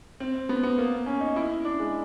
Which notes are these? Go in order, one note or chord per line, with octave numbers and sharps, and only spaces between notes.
C4
B3
B3
A#3
C#4
D#4
E4
D4
G#3